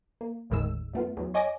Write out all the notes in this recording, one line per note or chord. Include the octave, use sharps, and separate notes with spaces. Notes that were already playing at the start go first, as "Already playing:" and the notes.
A#3
G1 D#2 A2 D#3 G#3 E6
F#2 A3 B3 F4
E2 F#3
C#5 D#5 G#5 D6 A#6